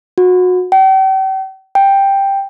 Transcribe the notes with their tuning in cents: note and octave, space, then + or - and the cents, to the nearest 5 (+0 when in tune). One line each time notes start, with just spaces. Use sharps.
F#4 -25
G5 -40
G5 +5